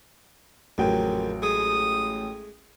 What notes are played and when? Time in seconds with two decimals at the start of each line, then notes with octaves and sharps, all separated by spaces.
0.78 A1 F2 A#2 C#3 F#3 G5
1.42 G#3 A3 G#4 D#6